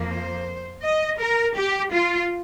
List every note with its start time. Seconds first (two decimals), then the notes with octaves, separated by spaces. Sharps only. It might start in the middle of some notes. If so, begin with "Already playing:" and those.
Already playing: F2 F3 A#3
0.09 C5
0.82 D#5
1.18 A#4
1.55 G4
1.92 F4